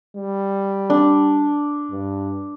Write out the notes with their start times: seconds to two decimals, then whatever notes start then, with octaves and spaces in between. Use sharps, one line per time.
0.16 G3
0.90 D4
1.91 G2